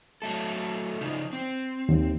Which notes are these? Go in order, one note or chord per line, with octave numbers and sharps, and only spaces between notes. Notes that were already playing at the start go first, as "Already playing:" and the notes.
F#3 A3 A4
C#3 F3 D#4
C4
D#2